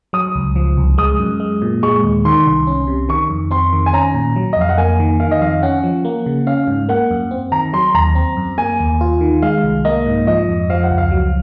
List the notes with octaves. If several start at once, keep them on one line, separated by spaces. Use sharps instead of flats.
F#3 D#6
C#2
F3
C2
G#3 D#6
F#2
G#3
A#2
G#3 C#6
D#2
D#3 C6
C2
C#4
C3
D#3 C#6
F2
C4 C6
D#3
G#5
C#4 A#5
A#2
F#3
D#5
F2 F5
F#5
A#3 G#5
D#3
D#3 F5
D#5
F2 F5
C#4 F#5
F3
A#3
C#3
C#4 F5
G#2
A#3 F#5
F#2
C4
D#3 A#5
F#3 C6
D#2 A#5
C4
F#2
A#3 G#5
D#2
F4
D#3
G#3 F5
C2
A#3 D#5
G#2
F3 D#5
F2
F3 F5
F#5
C#2
F5
F#3